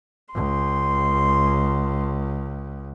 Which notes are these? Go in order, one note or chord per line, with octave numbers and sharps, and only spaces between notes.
C#2 C6